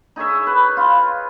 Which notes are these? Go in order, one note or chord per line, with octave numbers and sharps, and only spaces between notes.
D#4 G#4 C#5 E5
B4
F4